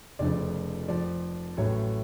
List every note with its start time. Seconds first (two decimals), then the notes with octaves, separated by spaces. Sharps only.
0.19 F1 F2 C#3 F3 D5
0.88 F2 F3 D5
1.57 A1 A2 F#3 C#5